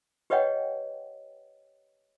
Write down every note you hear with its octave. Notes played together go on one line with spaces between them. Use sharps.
G4 B4 C#5 D#5 F#5 G5